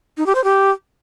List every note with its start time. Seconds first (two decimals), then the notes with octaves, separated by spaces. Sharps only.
0.17 D#4
0.26 G4
0.35 C5
0.44 G4